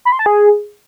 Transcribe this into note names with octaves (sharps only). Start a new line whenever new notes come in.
B5
C6
A5
G#4